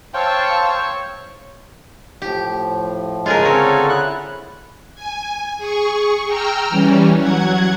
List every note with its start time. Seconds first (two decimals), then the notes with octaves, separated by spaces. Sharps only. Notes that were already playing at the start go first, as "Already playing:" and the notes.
0.14 C5 C#5 F5 G5 A5 E6
2.22 A2 F3 G4
3.26 C#3 G#3 F4 G#4 A#4
3.45 D3 C4 A4 A#4 C#5
3.89 E4 F#6
4.95 G#5
5.58 G#4 C#6
6.26 G5 A#5 E6 F6
6.69 E3 G3 C#4
7.17 F#3 F#5 G#6